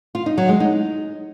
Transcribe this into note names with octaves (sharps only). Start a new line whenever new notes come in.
F4
D#4
F#3
G#3
D#4